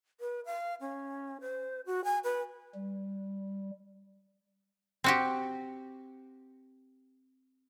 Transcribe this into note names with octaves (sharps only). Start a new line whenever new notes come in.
B4
F5
C#4
C5
F#4
G#5
B4
G3
C4 F#4 G4